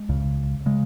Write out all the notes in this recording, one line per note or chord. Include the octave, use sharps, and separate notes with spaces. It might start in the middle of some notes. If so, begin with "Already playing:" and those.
Already playing: G#3
C#2 C#3
C#3 G#3